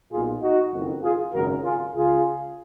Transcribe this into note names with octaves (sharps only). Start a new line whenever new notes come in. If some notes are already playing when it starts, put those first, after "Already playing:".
B1 A#2 F4 G#4
D#4 F#4
F#1 F2 D#3
F4 G#4
G#1 F#2 C#3 F#4 A#4
F4 G#4
C#2 C#3 F4 G#4